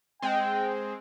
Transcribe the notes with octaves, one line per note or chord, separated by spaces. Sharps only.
G#3 C4 G5